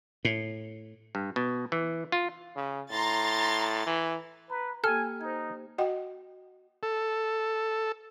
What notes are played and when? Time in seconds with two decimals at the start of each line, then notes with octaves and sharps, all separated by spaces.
0.25 A2
1.15 G2
1.36 B2
1.72 E3
2.12 F4
2.56 C#3
2.90 A2 A#5 C6 A6
3.86 E3
4.50 B4 A#5
4.84 A#3 G4 A4 G5 G#5 F6
5.21 D#4 C5 G#6
5.78 F#4 D#5 F#5 G5
6.83 A4